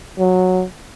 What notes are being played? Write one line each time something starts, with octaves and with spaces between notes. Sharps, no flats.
F#3